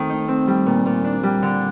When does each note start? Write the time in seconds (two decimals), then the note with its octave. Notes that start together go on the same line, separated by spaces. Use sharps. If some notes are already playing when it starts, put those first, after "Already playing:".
Already playing: D#3 A3 C4
0.09 D#4
0.28 C4
0.47 G3
0.66 A#2
0.86 A#2
1.04 D4
1.23 G3
1.42 D3